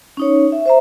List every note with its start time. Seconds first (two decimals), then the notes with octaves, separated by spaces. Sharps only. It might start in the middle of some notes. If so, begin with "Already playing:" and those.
0.17 C#4 D#4 C#5
0.52 E5
0.66 C5 E5 A#5